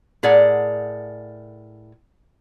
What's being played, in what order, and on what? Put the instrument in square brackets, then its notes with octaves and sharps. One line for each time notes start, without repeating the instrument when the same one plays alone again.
[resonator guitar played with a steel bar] A2 G#4 A#4 D5 F#5